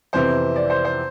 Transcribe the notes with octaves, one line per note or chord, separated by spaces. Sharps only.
F2 C3 E3 B3 C5
D5
C5
C5